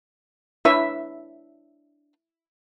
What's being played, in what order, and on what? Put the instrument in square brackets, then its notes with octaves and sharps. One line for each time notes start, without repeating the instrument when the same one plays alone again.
[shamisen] D4 B4 C#5 [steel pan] E4 E5